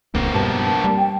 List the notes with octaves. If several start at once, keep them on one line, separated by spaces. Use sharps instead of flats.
D#1 C#2 A#3 C4
G2 B2 A5
G3
G5